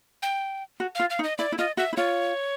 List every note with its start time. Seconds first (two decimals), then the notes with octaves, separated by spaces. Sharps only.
0.22 G5
0.80 F#4
0.95 F4 F5
1.10 F5
1.19 D#4
1.24 D#5
1.38 E4 D5
1.52 E4
1.58 F4 D#5
1.77 F#4 E5
1.93 E4
1.97 F4 C#5